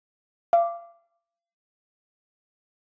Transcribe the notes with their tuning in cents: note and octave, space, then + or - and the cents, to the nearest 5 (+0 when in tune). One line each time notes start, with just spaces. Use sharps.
F5 -35 D6 +0